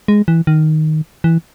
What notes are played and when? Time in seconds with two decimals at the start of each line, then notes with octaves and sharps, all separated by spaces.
0.08 G#3
0.28 E3
0.47 D#3
1.24 E3